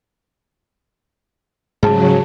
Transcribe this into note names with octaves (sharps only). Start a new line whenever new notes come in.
G#2 C#3 F#3 G3 G#4 A5